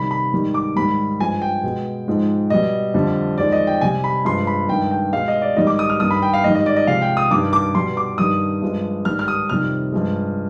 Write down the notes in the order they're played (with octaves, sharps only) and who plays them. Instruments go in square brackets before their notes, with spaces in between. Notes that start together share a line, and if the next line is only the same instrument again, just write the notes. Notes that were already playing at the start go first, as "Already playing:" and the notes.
Already playing: [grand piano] C3 D#3 G3 B5
B5
G#2 D#3 G3
D6
G#2 D#3 G3 B5
G2 F3 G#3 G#5
G5
B2 G#3
G#2 F3 G#3
B2 G3 D#5
F2 D3 G3
F2 D#3 G#3 D5
D#5
G5
C3 G3 G#5
B5
G2 F3 G#3 C6
B5
G2 D#3 G#3 G5
G5
B2 G#3 F5
D#5
D5
G#2 D#3 G3 D#5
D6
D#6
F6
G2 D#3 G3 D#6
B5
G5
F5
G#2 D#3 G3 D#5
D#5
D5
D#5
C3 F3 G#3 F5
G5
D#6
G2 D#3 G3 D6
D6
B2 G3 C6
D6
G2 D#3 G3 D#6
G2 F3 G#3
G#2 D#3 G3 F6
F6
D#6
F2 C3 D#3 G3 F6
G2 F3 G#3